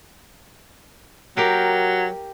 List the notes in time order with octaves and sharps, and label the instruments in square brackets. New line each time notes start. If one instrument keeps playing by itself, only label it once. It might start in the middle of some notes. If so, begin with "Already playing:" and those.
[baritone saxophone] F#3 [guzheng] G4 A#4 F5